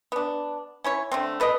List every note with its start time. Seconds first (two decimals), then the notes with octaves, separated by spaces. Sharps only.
0.12 B3 D4
0.84 C#4 E4 C#5
1.12 D3 A3 C4
1.40 A4 B4 D5 D#5